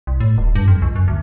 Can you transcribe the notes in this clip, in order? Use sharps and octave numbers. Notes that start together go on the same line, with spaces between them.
C2
A2
D#1
G2
F2
C#2
F#2
D2